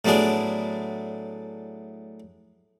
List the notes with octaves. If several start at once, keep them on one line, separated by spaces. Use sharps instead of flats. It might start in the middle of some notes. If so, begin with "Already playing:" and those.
A2 F#3 B3 D4 G#4